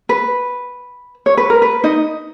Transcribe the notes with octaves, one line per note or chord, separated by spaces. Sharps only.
B4
C#5
B4
A#4
B4
D#4 D#5